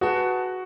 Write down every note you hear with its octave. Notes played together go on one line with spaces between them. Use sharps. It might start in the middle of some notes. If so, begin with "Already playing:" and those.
F#4 G#4 B4 F#5 A5